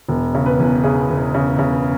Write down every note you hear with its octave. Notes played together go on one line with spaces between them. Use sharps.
E1
C#3
B4
E2
C#3 G#4
E1
C#3
C#3